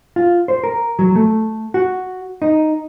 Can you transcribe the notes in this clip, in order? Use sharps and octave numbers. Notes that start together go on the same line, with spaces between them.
F4
C5
A#4
F#3
A3
F#4
D#4